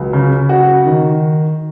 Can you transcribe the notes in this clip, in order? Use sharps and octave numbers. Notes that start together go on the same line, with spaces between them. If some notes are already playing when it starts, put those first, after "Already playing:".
Already playing: C#2 F#3
C#3
F#4
D#3